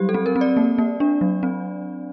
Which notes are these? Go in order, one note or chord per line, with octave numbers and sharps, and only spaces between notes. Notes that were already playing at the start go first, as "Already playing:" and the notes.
Already playing: F#3 G3 G4
A4
C4
A#4
C4
D5
A#3
A#3
D4
F#3
C4